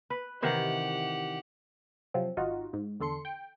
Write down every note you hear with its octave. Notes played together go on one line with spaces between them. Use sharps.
B4
C3 D#3 E3 G4 F#5
C3 F3 F#3 C4
G#1 D#4 F4 F#4
G#2
E2 D3 A4 C6 C#7
G5